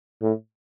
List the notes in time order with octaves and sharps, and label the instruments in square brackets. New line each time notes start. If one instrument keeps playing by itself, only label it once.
[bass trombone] A2